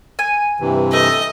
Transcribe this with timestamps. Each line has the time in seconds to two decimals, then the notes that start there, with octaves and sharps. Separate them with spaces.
0.19 G#5
0.60 G2 C3 E3
0.93 A3 D#5